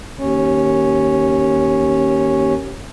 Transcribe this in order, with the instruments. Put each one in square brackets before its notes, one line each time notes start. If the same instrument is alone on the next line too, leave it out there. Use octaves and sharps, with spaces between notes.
[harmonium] D#2 C#4